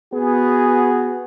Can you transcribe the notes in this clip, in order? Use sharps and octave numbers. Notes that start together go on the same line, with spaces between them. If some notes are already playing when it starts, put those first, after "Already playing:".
B3 F#4 G#4